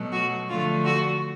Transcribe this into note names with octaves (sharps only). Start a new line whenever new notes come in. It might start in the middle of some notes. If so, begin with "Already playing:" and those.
Already playing: B2 F#3 A3
F#4
D3 F3 A3 F4
F#4